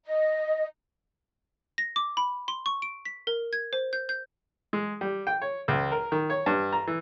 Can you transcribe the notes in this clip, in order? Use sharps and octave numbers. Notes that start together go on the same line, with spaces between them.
D#5
A#6
D6
B5
C6
C#6
D7
B6
A#4
G#6
C5
G6
G6
G#3
G3
G5
C#5
C#2
A#4
D#3
C#5
G2
A#5
E3